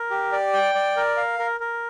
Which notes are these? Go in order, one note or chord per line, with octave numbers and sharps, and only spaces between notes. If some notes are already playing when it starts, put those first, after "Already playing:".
Already playing: A#4
G4
D5
G5
D5
A#4
F5
A#4
A#4